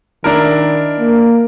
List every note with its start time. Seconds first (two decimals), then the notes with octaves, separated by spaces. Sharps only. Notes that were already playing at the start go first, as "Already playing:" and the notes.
0.24 D#3 D4 E4 A#4
0.99 A#3